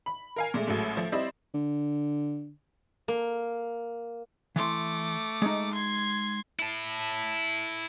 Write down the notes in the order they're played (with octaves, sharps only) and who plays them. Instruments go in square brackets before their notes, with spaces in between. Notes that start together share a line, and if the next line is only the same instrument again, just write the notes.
[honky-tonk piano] B5
A#4 F5 G#5
A#2 G#3 A3
A1 A2 F#3 G#3 A3
F3 A3
G3 C4 E4 C5 D5 D#5
[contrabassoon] D3
[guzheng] A#3
[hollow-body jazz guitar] E3 C6 [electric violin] A3 D6
[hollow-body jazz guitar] G#3 D#4
[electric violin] C6 G#6
[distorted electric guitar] E4 A5